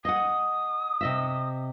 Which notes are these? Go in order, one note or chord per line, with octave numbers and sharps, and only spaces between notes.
D#5 F#5 D#6
C3 D#5 E5